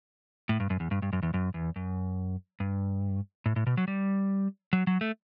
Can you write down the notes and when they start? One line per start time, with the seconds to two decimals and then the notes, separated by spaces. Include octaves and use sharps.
0.49 A2
0.60 G2
0.70 F#2
0.80 E2
0.91 G2
1.02 G2
1.13 F#2
1.23 E2
1.34 F#2
1.54 E2
1.76 F#2
2.60 G2
3.46 A2
3.56 A2
3.67 B2
3.77 F#3
3.88 G3
4.73 F#3
4.87 F#3
5.01 A3